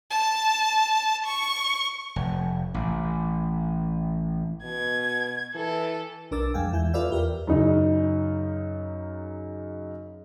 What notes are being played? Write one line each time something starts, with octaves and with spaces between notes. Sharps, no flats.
A5
C#6
F1
A1
B2 G#6
E3 A4
B1 D4 A#4 D6 E6 A6
F2 G#3 F5 G5 G#5
E2 E4 G#5 G6
F4 A4 B4 D5 E5 F5
E2 G4 A#4 F6
F#2 C#3 D#4